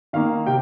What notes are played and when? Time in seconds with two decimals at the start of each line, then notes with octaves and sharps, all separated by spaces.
0.13 D#3 A#3 F5
0.46 C3 G5